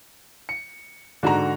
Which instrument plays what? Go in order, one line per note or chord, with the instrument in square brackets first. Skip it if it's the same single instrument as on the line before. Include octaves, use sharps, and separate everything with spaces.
[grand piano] C#7
[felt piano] G#2 A#5 [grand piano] D3 F#4